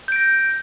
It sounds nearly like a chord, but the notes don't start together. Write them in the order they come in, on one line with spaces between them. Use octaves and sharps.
G6 D7 A#6